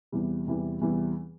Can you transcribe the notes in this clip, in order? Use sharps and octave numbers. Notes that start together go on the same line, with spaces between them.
E2 C3 E3 G3
E2 C3 E3 G3
E2 C3 E3 G3